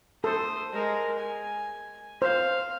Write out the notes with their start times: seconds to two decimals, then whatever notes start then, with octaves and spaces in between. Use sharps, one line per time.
0.24 A4 C5 D#6
0.73 G#3 A#4
1.19 G#5
2.22 C5 F5